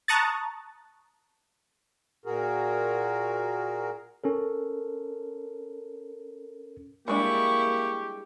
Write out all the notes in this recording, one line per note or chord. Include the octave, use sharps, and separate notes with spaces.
A5 A#5 C#6 D#6 F#6 A6
A#2 F#4 G#4 A#4
C#4 A4 A#4
G3 G#3 A#3 D4 E4 G4 C#6